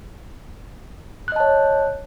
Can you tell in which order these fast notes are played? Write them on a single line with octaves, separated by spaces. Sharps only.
F#6 D#5 A5 C#5